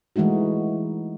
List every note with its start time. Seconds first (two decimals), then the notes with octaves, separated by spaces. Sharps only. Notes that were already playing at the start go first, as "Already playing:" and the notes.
0.16 E3 G#3 A3 D#4 F#4